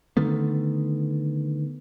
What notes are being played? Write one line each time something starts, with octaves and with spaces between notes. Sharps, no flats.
D3 D#3 A3 B3